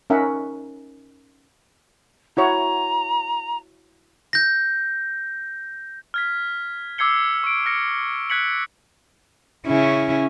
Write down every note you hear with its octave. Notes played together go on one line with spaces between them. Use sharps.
C#4 D#4 A#4 E5 F#5
E4 F#4 C#5 A#5
G6 A#6
F6 G#6 B6
D6 E6 G#6 C7 C#7 G7
C#6 D7
F6 A#6 C#7 D7
F#6 G#6 B6 C#7 F#7
C#3 C#4 E4